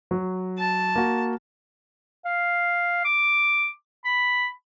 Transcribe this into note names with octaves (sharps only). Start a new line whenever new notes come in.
F#3
A5
A#3 F#4
F5
D6
B5